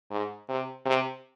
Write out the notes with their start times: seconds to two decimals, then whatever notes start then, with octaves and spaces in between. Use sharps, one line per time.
0.11 G#2
0.49 C3
0.86 C3